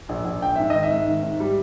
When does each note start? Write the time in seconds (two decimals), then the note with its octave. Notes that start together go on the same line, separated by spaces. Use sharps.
0.09 A#1
0.25 A#1
0.42 A#1 G5
0.56 G#2 E5
0.70 D#3 D#5
0.83 E5
0.91 G#2
1.08 D#3
1.23 G#2
1.40 G3